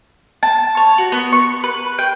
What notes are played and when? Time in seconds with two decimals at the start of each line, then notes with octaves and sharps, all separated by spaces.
0.43 A5
0.77 C#5
0.98 F#4
1.12 B3
1.33 C#6
1.64 B4
1.99 G5